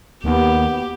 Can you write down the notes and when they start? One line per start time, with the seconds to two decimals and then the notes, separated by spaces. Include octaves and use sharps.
0.24 D#2 B3 G4